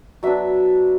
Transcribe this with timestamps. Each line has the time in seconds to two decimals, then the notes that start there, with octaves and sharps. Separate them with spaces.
0.23 F#3 B3 D4 E5